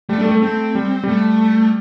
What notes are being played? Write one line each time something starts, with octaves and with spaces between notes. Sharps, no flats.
G3 A3
D4
A3
G3
A3
A3 C4
G3
G3 A3